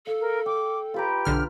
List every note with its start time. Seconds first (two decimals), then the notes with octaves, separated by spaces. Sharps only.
0.07 A4 F5
0.20 A#4
0.46 G5 D6
0.94 F4 G4 B4 A#5
1.25 B1 D3 F6